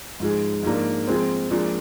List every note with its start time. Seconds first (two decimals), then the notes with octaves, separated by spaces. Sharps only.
0.20 G#2 F3 G#3
0.63 G#2 F3 A#3 D4
1.07 F3 G#3 C4
1.51 A#2 F3 G#3 D4